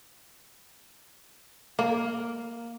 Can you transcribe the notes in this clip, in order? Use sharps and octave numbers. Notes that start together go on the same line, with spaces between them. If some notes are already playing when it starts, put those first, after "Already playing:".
A#3